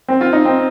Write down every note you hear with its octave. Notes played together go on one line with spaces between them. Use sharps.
C4
F4
D#4
C4